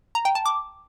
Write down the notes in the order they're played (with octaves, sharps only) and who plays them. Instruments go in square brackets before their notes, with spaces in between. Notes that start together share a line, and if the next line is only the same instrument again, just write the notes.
[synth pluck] A#5
G5
A5
D6